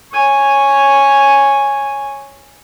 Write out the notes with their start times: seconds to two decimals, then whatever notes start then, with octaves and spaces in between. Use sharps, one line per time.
0.12 C#5 G#5